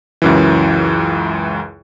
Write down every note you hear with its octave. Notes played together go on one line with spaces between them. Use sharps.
C#2 F#2 E3